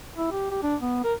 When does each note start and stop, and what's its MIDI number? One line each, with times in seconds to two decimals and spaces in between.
0.17 0.32 64
0.32 0.48 67
0.51 0.61 67
0.63 0.76 62
0.82 1.01 59
1.04 1.14 70